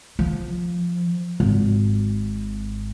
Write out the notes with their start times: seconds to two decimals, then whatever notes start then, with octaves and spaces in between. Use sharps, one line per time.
0.19 F3
1.40 G#1